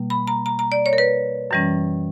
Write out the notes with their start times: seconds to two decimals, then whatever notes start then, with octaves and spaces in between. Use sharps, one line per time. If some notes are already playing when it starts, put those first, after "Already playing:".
Already playing: B2 G3 A#3
0.10 B5
0.28 A#5
0.46 A#5
0.59 A#5
0.72 D5
0.86 C#5
0.93 A#4
0.98 B4
1.51 F#2 E3 G3 C#4